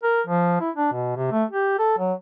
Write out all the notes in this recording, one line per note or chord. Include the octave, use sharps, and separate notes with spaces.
A#4
F3
E4
D4
B2
C3
A3
G4
A4
F#3